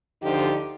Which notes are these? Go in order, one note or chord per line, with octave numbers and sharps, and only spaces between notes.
D2 D3 F3 D#4 G4